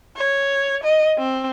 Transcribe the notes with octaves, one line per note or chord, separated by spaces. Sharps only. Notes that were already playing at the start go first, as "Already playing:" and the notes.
C#5
D#5
C4